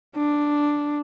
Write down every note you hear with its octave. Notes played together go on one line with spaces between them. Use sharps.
D4